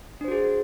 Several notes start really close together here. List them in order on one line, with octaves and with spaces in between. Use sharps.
D4 C5 F#4 G#4